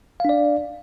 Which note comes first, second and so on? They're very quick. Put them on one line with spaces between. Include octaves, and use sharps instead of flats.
F5 D4 D5